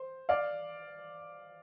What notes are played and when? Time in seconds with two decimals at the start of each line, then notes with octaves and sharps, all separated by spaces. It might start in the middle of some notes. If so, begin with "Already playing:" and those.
Already playing: C5
0.29 D5 F5